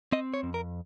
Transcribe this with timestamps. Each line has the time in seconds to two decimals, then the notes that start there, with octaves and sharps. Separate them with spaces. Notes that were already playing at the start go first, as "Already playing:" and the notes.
0.12 C4 D#5
0.34 C#5
0.43 F2
0.54 A#4